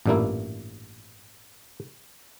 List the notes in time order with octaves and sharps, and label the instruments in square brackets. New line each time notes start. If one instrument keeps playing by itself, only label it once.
[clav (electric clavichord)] A1 G2 A#2 A3 A#3 E4